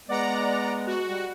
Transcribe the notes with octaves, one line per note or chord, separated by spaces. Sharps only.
G#3 B3 D5 F#5 A#5
F#4
G3